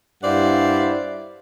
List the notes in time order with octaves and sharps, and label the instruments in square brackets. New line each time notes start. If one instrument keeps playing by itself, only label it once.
[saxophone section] G2 E4 C5 D5 F5 F#5